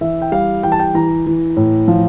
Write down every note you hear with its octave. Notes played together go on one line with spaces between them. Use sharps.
E3 E5
G5
G3 F5
E3 G5
A5
G5
E3 A#5
E3
A2
F3